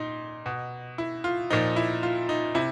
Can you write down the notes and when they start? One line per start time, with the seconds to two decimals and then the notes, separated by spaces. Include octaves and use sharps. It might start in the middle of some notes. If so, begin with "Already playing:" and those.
Already playing: A#2 D#4
0.46 B2
0.98 E4
1.24 F4
1.50 A#2 F3 D#4
1.76 E4
2.03 F4
2.29 D#4
2.55 C3 E4